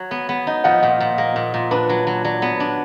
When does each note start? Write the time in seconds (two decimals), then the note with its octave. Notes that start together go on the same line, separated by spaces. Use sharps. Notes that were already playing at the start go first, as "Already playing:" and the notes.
Already playing: F#3 F#4
0.11 B3
0.29 B3
0.47 D#4
0.64 F3 D#5 F#5
0.83 A#2
1.00 A#2
1.18 A#3
1.36 A#2
1.54 A#2
1.71 D4 B4
1.89 F#3
2.07 F#3
2.25 F#3 D5
2.42 B3
2.60 D4